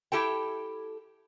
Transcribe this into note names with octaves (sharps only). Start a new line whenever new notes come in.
E4 G4 A4 G5